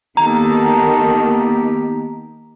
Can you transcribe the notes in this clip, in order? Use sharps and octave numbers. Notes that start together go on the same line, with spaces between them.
D#3 A#3 B3 D#4 G4 A4 A#5